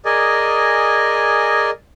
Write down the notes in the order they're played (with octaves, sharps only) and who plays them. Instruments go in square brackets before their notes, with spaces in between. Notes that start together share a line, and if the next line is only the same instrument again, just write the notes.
[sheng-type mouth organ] G#4 A#4 D5 D#5 G#5